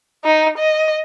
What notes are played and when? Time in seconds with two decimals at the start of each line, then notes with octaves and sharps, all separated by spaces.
0.25 D#4
0.58 D#5